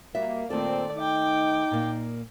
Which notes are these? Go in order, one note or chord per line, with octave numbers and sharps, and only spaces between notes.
G3 A#3 F#4 E5
A#2 D#3 A3 C4 A4 D5
D#4 G5 D6
A#2 A#3